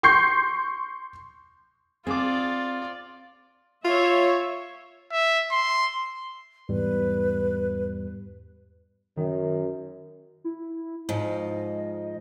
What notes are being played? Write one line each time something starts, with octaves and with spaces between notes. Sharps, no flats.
C6 C#6 G6 C7
C4 F4 G#4 D5 D6
F4 C#5 E5
E5
C6
E2 G#2 G3 B4
F#2 D#3
E4
G#2 F3 D#5